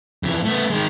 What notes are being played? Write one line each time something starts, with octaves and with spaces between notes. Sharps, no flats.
F2 E3
A3 B3
D#3 G#3